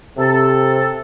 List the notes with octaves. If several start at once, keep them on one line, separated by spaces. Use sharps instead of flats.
C3 A4